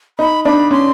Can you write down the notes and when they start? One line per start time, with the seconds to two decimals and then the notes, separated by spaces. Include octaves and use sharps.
0.19 D#4 B5
0.45 D4 B5
0.71 C#4 C6